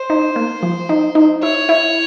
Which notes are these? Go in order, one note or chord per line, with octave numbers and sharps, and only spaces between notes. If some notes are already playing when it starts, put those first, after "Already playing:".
Already playing: C5
D#4
A#3
F3
D#4
D#4
E4 C#5
E4